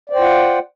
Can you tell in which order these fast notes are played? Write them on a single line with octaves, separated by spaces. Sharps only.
D5 C5 G5 F4 F#5